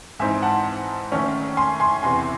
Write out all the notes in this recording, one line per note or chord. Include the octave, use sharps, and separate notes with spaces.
G#2 E3 C4 D#4 E5 G#5
F#5 A5
D#3 A3 C#4
G#5 C6
G#5 C6
E2 C3 E3 G#5 C6